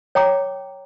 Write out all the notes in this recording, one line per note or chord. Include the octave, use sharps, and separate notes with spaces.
C#5 G5 A#5 D6